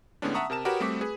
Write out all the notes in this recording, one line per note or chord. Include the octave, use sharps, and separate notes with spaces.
A2 D3 G#3 B3 C#4 D4
E5 F#5 A5 A#5 C#6 D#6
C3 A#4 A5 E7
F#4 G4 A#4 B4 C#5 F#5
G3 A3 C4 F#4 D6 B6
G#4 B4